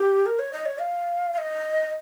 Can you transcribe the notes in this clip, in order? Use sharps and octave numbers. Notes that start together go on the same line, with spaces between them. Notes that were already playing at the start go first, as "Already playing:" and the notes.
Already playing: G4
A#4
C#5
D#5
C#5
F5
F5
D#5